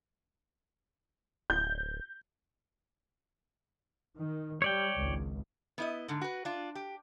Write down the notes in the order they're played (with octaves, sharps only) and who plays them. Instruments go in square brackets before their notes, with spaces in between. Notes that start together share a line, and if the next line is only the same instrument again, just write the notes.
[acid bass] D1 [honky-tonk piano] G6
[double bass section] D#3
[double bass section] G3 [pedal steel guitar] C#5 D5 G5
[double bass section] G#1 C#2
[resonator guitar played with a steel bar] B3 E4 D#5
G#2 D3
F#4 B4
D4 F4
G4